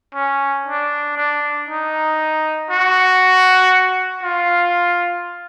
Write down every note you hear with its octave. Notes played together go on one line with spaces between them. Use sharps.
C#4
D4
D4
D#4
F#4
F4